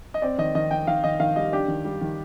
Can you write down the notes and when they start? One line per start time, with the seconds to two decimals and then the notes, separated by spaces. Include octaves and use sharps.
0.14 D#5
0.22 C4 D5
0.38 D#3 D#5
0.55 D#3 D#5
0.71 D#3 G5
0.87 D#3 F5
1.04 D#3 D#5
1.20 D#3 F5
1.36 G3 D#5
1.52 D4 G4
1.68 D#3
1.85 G3
2.01 D#3